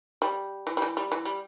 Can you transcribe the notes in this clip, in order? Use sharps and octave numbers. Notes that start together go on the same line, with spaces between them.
G3
E3
G3
E3
G3
E3
G3